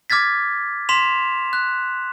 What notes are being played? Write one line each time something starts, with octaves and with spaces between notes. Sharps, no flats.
D6 F6 G#6 A6 B6
C6 B6 E7 F7
F#6